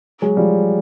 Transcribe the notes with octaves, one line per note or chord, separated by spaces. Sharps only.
F#3 G#3
F3 G3